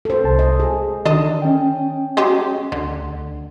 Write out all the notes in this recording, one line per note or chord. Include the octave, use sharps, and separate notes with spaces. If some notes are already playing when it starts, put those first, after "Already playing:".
A4 C5
C2 A5
D#5
G#4
D#3 D4 A4 D#5
C#4 G5
F#3 G#3 G4
D2 D3